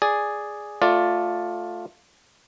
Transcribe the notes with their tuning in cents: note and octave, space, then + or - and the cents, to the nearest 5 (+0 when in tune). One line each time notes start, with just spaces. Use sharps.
G#4 +0 D5 +0
A3 +0 F4 +15 D5 +0